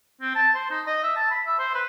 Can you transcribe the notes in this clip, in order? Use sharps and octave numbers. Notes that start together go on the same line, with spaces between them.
C4
A5
C5
D#4
D#5
E5
A5
B5
E5
C5
B4